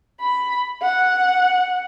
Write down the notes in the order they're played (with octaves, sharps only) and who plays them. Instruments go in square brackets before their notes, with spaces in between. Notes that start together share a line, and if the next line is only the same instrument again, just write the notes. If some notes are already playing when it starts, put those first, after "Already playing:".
[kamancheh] B5
F#5